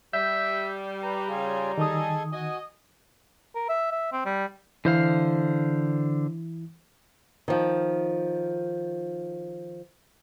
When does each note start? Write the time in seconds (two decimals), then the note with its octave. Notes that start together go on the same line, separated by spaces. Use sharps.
0.13 G3 E5 G6
1.03 G4 B4 A#5
1.28 C#3 F4 G#4
1.78 D#3 G#4 A4 D#5 D#6
2.32 F#4 D#5 G#5
3.55 A#4
3.69 E5
3.92 E5
4.12 C4
4.25 G3
4.85 D3 E3 E4 C5 F5
7.48 D#3 F3